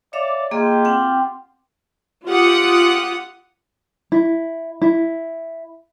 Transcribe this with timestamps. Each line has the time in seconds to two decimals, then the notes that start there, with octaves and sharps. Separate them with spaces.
0.13 C#5 D5 E5 F5
0.51 A#3 F4 G4 G#4 D#5
0.85 C4 F#5 G5
2.28 F4 G4 F#5 D#6
4.12 E4
4.82 E4